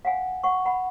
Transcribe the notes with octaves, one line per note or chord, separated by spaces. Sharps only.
F5 F#5 G#5
F#5 C#6
F#5 B5